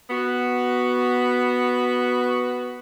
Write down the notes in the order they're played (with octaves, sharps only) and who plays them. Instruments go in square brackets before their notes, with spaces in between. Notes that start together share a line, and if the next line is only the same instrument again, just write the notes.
[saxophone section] B3 F#4